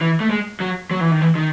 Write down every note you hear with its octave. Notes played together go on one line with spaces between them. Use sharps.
E3
A3
G#3
F#3
F#3
E3
D#3
E3
D#3